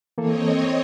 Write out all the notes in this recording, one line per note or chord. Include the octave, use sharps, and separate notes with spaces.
E3 A#3 C4 A4 C#5 D#5